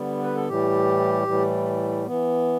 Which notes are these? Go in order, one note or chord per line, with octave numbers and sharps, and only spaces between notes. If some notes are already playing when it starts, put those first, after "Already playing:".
Already playing: D3 G3 B3
B4
A4
A2 E3 G3 G4
A2 E3 G3
E3 B3